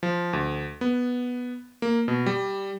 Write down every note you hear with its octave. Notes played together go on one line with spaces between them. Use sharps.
F3
D2
B3
A#3
B2
G3